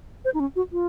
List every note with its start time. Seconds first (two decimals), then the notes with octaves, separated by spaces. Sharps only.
0.25 C5
0.34 D#4
0.40 C#4
0.56 F#4
0.72 F4